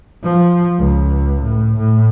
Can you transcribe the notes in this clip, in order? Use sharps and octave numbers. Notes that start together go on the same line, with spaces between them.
F3
C#2
A2
A2